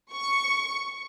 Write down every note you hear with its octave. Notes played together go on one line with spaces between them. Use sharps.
C#6